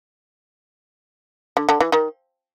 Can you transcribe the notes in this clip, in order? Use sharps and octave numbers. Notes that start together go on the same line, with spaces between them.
D3
D3
E3
D#3